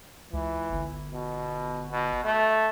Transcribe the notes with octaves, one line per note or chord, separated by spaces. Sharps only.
C#2 E3
G1
B2
B2
A3